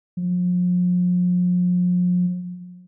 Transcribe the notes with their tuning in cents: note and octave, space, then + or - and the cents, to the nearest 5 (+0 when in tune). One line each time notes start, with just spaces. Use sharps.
F3 +40